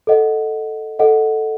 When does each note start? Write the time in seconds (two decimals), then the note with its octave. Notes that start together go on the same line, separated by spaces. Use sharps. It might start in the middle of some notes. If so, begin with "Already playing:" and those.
0.07 A4 D#5 F#5
0.99 A4 D#5 F#5